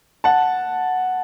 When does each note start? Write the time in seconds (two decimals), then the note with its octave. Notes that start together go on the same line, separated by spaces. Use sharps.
0.24 F#5 A5